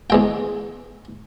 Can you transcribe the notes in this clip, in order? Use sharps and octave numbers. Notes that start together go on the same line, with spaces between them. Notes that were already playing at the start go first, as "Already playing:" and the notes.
E2 G#3 G5